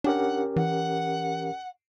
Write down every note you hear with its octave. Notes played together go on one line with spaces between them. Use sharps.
C#4 D4 G4 A#4 F#5
E3 F#5